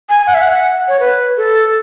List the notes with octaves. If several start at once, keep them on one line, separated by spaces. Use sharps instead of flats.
G#5
F#5
E5
F#5
F#5
C#5
B4
A4